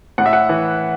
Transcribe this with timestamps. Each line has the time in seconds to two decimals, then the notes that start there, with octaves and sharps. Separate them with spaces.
0.18 A2 F#5
0.26 E5
0.33 F#5
0.49 E3